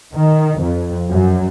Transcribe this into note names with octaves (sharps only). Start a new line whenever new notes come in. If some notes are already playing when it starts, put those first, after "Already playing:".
D#3
F2
F#2